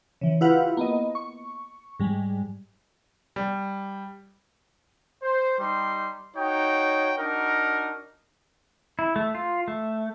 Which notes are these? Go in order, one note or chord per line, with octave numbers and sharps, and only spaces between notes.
C#3 E3
E4 F4 G4 B4 F5 F#5
A#3 B3 D#5
C#6
G#2 G3 G#3
G3
C5
G3 D#4 C6
D#4 F#4 C#5 G5
D4 D#4 F#4 A#4
E4
A3
F4
A3